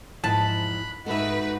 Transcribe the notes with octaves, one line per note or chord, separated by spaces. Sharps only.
E2 G#2 F3 A5 B5 F#6
G#2 D#4 F#4 A4 B4 E5